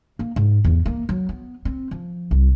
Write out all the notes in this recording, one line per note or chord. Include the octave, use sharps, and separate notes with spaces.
A#3
G#2
E2
A#3
F#3
B3
C4
F3
C2